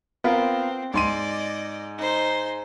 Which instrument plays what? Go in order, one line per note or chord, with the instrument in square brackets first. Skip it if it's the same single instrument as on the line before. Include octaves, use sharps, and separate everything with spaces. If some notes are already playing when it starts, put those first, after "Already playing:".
[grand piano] B3 F4 A#4 [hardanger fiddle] C4
[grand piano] G#2 C6 D#7 [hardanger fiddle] D5 D#5
[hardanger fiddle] D#4 C5